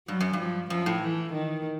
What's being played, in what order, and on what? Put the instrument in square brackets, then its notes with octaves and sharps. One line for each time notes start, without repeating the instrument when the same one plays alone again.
[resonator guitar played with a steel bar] G2 [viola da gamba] F#3
[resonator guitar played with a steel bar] F#2
G2
[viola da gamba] F3
[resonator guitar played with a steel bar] F#2 [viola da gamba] F3
[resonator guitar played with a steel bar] A2
[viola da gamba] E3
D#3